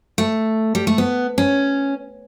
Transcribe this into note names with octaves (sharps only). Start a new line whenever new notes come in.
A3
G3
A3
B3
C#4